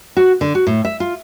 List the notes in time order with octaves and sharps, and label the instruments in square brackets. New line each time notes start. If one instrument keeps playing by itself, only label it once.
[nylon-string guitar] F#4
D3
F#4
A2
E5
F4